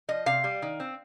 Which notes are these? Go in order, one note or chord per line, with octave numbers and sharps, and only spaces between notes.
F3 D#5
C3 F5
G3
D#3
C4